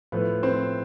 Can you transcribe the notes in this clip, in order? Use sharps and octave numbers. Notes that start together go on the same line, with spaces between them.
A2 F3 A3 B3 B4
C4 C5